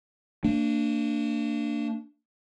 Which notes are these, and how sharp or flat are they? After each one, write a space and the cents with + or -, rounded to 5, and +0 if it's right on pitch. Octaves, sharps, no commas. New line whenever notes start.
A#3 -35 D4 +0